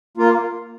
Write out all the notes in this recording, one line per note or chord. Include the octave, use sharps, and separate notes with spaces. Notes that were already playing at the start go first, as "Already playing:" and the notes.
A#3 F4